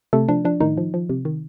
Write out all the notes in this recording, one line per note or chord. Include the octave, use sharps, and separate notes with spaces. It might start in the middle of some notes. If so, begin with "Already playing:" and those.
C3 A3 A4
F3 D4
F3 D4
A2 D#3 D#4
F3
F3
C3
D#3